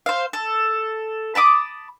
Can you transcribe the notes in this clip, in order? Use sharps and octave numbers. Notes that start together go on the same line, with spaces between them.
C5 F5
A4
A5 B5 D6 D#6